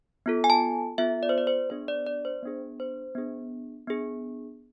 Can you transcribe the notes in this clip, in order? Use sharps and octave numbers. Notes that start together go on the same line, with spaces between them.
B3 F4 A4
G#5
A5
B3 F4 A4 E5
D5
C5
D5
C5
B3 D4 G#4 C5
D5
D5
C5
B3 D4 G#4
C5
B3 D4 G#4
B3 D4 G#4